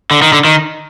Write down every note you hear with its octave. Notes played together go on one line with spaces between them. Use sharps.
D3
D#3
D3
D#3